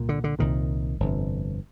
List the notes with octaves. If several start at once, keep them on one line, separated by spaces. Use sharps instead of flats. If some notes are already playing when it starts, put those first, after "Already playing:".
Already playing: C2 A#2
D3
D3
C2 A#2 D#3
G1 F2 C3